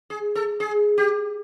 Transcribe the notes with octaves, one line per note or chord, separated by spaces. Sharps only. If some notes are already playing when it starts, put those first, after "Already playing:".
G#4
A4
G#4
G4